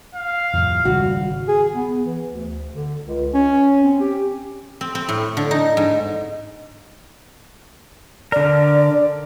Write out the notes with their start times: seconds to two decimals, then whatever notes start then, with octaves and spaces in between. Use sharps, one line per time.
0.15 F5
0.53 F2 A2 C3
0.85 G#1 C#3 G3 F#4
1.48 G#4
1.75 B3
2.05 E3
2.26 D2
2.75 D3
3.06 C#2
3.34 C#4
3.83 C4
4.00 G4
4.81 C4
4.95 C4
5.09 A2
5.37 D3
5.51 D#4
5.77 G#2
8.32 D3 A#4 D5